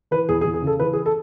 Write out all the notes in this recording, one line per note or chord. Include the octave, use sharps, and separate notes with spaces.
E3 B4
E2 G#4
G#4
E2
G#4
C#3 A4
E3 B4
G#4
A4